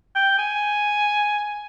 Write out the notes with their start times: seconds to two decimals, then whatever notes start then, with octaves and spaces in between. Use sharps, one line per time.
0.15 G5
0.38 G#5